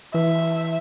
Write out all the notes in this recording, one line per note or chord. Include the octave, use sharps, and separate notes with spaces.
E3 E5